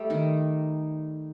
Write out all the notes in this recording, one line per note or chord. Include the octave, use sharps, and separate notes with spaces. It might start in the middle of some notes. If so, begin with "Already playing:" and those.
Already playing: G3 A3 G4 A4
D#3 D#4